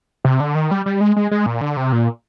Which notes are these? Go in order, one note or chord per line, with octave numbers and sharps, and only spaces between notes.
C3
D3
D#3
G3
G3
G#3
G#3
G#3
A#2
D3
C3
A#2